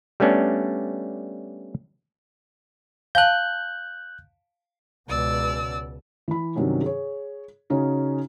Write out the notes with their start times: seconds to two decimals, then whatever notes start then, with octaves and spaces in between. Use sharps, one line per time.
0.20 G3 A3 B3 C#4 D4
3.15 F5 G#5 A5 F#6 G6
5.09 C#2 B2 D5 E6
6.28 E3 B5
6.55 G2 C3 D#3 F#3 C#4
6.82 G#4 C#5
7.70 C#3 C#4 D#4 F#4